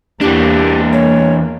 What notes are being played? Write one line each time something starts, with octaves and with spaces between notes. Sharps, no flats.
E2 E3 A#3 D4 G4
C#5